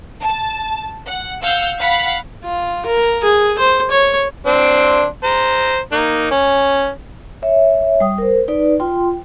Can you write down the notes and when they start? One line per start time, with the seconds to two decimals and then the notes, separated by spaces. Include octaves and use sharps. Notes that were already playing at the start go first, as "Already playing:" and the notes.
0.23 A5
1.07 F#5
1.42 F5 F#5 E6 G6
1.78 F5 F#5 B5
2.44 F4
2.86 A#4
3.24 G#4
3.59 C5
3.90 C#5
4.47 C4 D4 C6
5.24 C5 A#5
5.92 A#3 D#4
6.31 C#4
7.42 C#5 E5
8.00 G3 G5 D#6
8.18 A#4 C5
8.48 D#4 B4 D5
8.80 F4 G5 C6